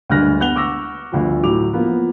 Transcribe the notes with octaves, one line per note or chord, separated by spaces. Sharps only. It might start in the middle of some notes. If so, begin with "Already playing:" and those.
D2 G2 G#3 F6 F#6 A#6
B3 F#5 F#6 F7 G7
C#6 D6 E6 A#6
G1 D2 F3
A2 F#3 D6 F7
F3 A#3 B3